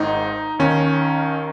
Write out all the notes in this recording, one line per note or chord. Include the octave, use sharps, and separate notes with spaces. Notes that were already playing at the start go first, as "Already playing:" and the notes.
Already playing: G#1 G#2 D#3 D#4
D#2 D#3 C#4